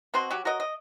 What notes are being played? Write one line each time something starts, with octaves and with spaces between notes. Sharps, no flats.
B2 C4 F#4 C6
F#3 F#4 G4
F#4 A#4 C#5 D#5
D#5